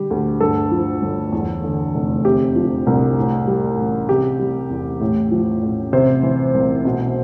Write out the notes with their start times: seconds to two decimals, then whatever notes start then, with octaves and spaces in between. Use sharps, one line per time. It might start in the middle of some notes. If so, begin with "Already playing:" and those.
Already playing: D3 G3 G4
0.10 D2
0.40 G2 A4
0.71 F3
1.02 G1
1.32 E2
1.64 D3
1.94 F1
2.25 C3 G4
2.56 F3
2.87 C2
3.17 A2
3.48 G3
3.78 A1
4.09 C3 G4
4.39 G3
4.70 E2
5.00 A2
5.31 F3
5.63 A1
5.93 C3 C5
6.23 E3
6.54 C2
6.85 B2